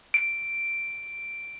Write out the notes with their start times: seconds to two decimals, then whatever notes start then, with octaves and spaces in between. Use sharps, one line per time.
0.14 D7